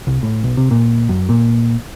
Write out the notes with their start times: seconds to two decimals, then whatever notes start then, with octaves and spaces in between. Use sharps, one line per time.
0.07 C2
0.23 A2
0.44 B1
0.57 C3
0.71 A#2
1.09 F#2
1.29 A#2